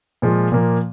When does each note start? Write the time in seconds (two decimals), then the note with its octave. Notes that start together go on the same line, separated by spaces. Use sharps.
0.22 A#2 F3 G#3
0.52 A#2 F3 A#3